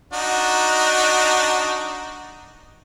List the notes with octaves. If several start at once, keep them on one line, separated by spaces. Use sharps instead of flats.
D4 D#4 F#4